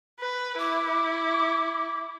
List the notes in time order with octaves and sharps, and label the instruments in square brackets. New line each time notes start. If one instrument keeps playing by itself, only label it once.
[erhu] B4
[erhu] E4 [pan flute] D6